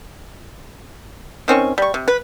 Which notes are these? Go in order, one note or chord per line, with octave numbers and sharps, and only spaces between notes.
D#3 C4 C#4 C#6
G3 C#6
C3
B4